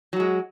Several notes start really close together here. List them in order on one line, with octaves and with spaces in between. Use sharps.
F#3 F#4 G#3